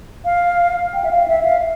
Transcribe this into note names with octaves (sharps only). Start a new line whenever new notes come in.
F5
G5
E5
F5
E5
F5